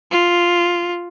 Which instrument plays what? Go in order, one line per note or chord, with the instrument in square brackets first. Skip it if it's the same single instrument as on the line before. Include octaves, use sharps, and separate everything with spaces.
[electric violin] F4